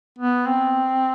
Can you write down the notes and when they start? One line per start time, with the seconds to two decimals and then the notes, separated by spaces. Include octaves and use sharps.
0.19 B3
0.47 C4